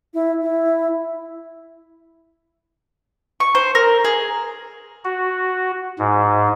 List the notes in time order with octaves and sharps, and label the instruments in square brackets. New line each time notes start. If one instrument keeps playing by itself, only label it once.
[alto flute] E4
E4
[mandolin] C#6
C5
A#4
G#4
[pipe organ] F#4
G#2